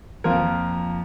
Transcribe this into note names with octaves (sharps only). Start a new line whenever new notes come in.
F2 F3 A#3 F4 A#4